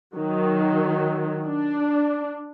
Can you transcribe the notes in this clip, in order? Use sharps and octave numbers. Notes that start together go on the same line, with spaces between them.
D#3 F#3
D4